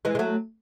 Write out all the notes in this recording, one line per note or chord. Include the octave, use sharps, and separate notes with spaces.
E3 G#3
G#3
F#3 A3